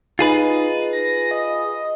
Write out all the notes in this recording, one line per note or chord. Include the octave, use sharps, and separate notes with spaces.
D#4 F4 G#4 B4
A#6
D#5